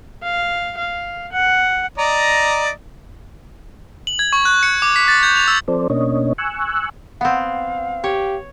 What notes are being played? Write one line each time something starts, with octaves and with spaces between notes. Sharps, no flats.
F5
F5
F#5
D5 D#5 A#5
F#7
G#6
C#6
F#6
C#7
D6
B6
A6
G6
F7
E6
F3 C4 A4 C5 D5
B2 A#3 C#4 D4 C#5 D#5
G#5 C#6 E6 F#6
B3 C4 F5 F#5
G4 C#5